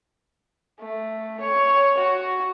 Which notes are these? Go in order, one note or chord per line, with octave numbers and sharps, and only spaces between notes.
A3
C#5
F#4